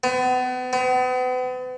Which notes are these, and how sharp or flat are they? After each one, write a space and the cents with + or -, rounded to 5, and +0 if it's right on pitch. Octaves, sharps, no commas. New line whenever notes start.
B3 +35
B3 +40